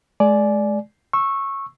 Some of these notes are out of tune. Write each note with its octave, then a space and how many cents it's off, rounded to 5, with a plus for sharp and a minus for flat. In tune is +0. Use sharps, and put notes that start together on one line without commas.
G#3 +30 D5 +0 G#5 +20
C#6 -15 E6 +0